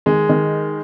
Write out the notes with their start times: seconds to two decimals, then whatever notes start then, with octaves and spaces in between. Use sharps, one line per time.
0.06 D#3 G#3
0.29 D#3